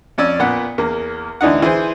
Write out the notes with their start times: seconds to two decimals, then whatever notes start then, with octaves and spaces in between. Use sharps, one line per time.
0.18 F2 C#4 D5 E6
0.40 A#2 B3 F#5
0.78 E2 A#3
1.41 D2 E3 D4 D#4 F#5
1.62 E3 G#4 C5